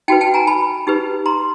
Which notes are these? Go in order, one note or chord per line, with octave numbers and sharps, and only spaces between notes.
D#4 F#4 B4 G5 A5
G5 A5
G#5 A#5
A5 B5
D#4 G4 B4
A#5 C6